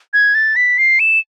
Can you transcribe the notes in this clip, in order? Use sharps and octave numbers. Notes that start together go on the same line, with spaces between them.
G#6
A6
B6
C7
E7